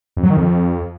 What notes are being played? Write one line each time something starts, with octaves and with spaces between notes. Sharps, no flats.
F2
F#3
D#3
F2